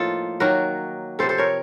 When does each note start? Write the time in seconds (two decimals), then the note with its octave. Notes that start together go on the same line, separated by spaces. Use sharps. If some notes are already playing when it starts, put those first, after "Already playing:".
Already playing: A2 F3 A#3 D#4 F4 A4
0.40 D#3 F#3 A#3 F#4 A#4
1.19 C3 F3 C4 A4 C5
1.29 A4 C5
1.38 A#4 C#5